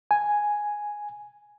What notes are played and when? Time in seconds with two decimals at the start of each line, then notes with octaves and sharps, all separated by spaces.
0.11 G#5